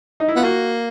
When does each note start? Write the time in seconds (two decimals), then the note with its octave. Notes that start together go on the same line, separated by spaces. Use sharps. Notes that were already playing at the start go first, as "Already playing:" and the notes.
0.20 D#4
0.28 E4
0.36 B3 F4
0.44 A#3 F#4